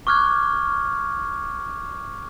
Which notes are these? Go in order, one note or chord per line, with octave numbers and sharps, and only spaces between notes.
C#6 D6 F6 F#6 G#6